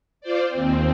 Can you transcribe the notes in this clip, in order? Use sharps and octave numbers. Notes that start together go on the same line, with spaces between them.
F4 C5 D5
D#2 C4